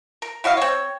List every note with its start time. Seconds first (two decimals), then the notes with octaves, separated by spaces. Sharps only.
0.22 A#4
0.44 E4 F#4 D#5 F5
0.57 C4 C#5